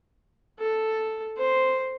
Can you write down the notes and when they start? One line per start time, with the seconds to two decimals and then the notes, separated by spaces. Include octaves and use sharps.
0.59 A4
1.37 C5